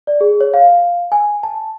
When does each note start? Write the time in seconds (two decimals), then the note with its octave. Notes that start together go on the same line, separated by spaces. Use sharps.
0.07 D5
0.21 G#4
0.41 C#5
0.54 F5
1.12 G#5
1.43 A5